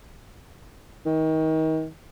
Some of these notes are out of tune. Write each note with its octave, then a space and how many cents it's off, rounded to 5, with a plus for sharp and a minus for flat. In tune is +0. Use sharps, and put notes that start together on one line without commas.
D#3 +30